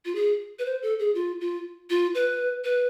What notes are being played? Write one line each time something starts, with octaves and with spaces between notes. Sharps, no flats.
F4
G#4
B4
C5
A4
G#4
F4
F4
F4
B4
B4